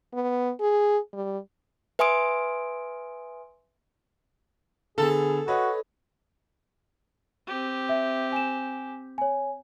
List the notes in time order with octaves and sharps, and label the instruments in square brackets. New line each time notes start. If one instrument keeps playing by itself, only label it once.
[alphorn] B3
G#4
G3
[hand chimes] B4 E5 G#5 C6 D#6 D7
[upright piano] D3 B3 [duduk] G#4 [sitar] A4
[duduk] F#4 [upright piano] B4 C#5 D#5
[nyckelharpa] C4 G4
[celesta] E5
G#5 E7
C#5 G#5